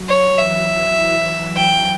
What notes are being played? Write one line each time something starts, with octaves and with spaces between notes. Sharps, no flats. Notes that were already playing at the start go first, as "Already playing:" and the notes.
Already playing: F#3
C#5
E3 E5
G5